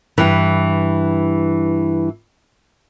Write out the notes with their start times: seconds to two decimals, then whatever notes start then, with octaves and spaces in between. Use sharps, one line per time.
0.18 G2 E3